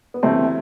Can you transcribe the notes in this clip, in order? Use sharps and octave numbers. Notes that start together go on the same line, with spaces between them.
B3
D2 C3 E3 A3 C4